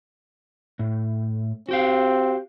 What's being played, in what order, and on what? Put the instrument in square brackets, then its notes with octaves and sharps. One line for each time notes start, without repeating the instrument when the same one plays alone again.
[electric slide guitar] A2
[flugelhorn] C4 [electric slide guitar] F#4 G4 F5